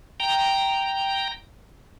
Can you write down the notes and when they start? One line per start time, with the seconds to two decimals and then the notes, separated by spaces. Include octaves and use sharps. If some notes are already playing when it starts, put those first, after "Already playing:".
0.20 G5 A#5